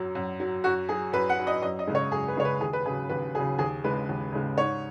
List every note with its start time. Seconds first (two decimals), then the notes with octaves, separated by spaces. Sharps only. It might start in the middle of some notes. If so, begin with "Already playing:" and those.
Already playing: F#2 F#3
0.15 F#2
0.40 F#3
0.64 F#2 F#4
0.89 F#3 G#4
1.13 F#2 B4
1.30 F#5
1.38 F#3
1.47 D#5
1.62 F#2 D#5
1.79 D#5
1.87 C#3 G#3
1.95 C#5
2.12 F#2 G#4
2.28 B4
2.37 C#3 G#3 C#5
2.45 B4
2.61 D#2 G#4
2.73 B4
2.85 C#3 F#3 G#4
3.09 D#2 B4
3.35 F#3 G#4
3.39 C#3
3.59 D#2 G#4
3.84 C#3 G#3 B4
4.09 D#2
4.32 C#3 G#3
4.58 G#2 C#5